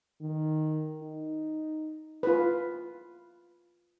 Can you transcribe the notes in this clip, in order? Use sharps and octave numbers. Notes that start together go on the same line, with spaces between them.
D#3
D#4
F4 B4